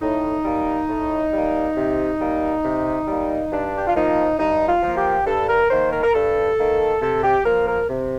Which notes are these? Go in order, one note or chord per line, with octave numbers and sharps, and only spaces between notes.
A2 D#4
G3 A#3
A2
G3 A#3
C3
G3 A#3
C3
G3 A#3
G2 D4
G4
F4
F3 A#3 D#4
G2 D#4
F4
F3 A#3
G4
G2 A4
A#4
D#3 A#3 C5
A#4
A#4
G2 A4
D#3 A#3
C3 A4
G4
F3 A#3 A#4
A#4
C3